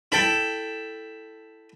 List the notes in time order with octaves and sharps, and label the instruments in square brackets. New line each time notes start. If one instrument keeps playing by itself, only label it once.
[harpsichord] E4 A4 G5